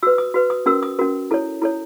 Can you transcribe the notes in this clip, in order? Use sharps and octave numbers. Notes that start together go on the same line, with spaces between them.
F#4 B4 E6
D#6
F#4 B4
D#6
C#4 F#4 A#4 E6
D#6
C#4 F#4 A#4
E4 A4 C#5
E4 A4 C#5